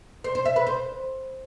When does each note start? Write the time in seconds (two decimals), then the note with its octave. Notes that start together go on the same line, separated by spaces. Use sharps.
0.24 C5
0.35 C5
0.45 E5
0.56 B4
0.67 C5